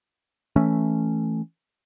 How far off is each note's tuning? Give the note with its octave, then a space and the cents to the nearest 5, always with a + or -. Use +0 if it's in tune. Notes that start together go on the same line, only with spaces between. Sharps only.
E3 +0 A3 +5 C#4 +0